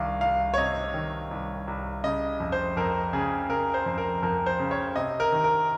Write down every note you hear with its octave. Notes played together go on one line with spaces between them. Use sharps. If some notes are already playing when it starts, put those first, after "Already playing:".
Already playing: C2 D#3 F5
C2 F5
C#5
C3 D#5
D#3
C2
C2
C#3 D#5
F2
C5
F2 A#4
C#3 G#4
C#3 A#4
C5
F2
A#4
F2 A#4
C5
C#3
C#5
C3 D#5
A#4
D#3
A#4